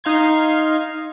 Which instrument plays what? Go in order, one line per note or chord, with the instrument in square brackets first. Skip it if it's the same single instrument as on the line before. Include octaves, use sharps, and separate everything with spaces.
[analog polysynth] D#4 F5 C6 G#6